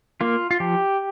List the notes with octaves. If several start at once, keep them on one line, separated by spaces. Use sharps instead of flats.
A#3 F4
F4
F3 G4